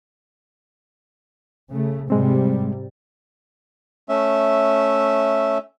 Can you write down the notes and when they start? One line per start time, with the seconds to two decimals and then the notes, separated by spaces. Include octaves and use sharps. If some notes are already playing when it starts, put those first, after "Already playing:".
1.71 C#3 A3
2.10 G#2 C3 G3 G#3 C4
4.09 A3 C#4 E5